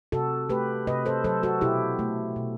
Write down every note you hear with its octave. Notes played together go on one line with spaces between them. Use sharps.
C3 F#4 A4
A3 G4 B4
C3 B4 D#5
A4 C5
F#3 A4 C5
F#4 A4
B2 E4 G4
A3
B2